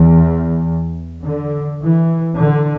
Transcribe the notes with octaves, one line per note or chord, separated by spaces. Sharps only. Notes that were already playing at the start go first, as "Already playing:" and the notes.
Already playing: E2
D3
E3
D3